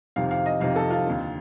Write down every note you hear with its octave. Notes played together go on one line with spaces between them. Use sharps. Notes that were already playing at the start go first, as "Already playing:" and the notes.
F2 C3 D#3 F5
F5
D#5
F2 C3 D#3 F5
A4
F4
D#2 D3